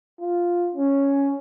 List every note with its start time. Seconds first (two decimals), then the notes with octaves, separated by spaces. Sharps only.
0.20 F4
0.75 C#4